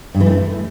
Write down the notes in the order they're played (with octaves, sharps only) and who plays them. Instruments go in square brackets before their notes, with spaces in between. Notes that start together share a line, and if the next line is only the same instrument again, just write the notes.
[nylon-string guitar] G2
E3
A3